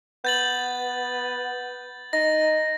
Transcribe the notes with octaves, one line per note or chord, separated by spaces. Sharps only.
B3 G6 A6 F#7
D#4 A#6